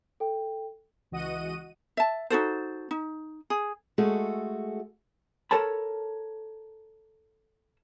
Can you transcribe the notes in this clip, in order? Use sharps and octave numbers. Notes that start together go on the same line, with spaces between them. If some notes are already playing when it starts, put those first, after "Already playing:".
A4 G5
C#2 E3 F#4 D#5 F#5 D#7
E5 A5
D#4 F#4 A4 C5
D#4
G#4
G#3 A3 F#4 G#4 A4
A4 A#4 C#5 A5 B5